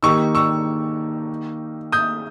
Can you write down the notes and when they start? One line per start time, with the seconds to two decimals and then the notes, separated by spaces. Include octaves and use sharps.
0.03 D#3 A#3 D#4 G4 C#6 E6
0.35 C#6 E6
1.92 D#6 G6